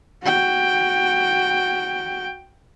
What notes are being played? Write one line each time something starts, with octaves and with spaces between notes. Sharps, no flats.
F#4 G5